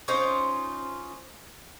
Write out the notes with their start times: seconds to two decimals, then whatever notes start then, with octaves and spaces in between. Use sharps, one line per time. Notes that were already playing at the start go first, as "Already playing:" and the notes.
0.08 C#4 D#4 F4 C5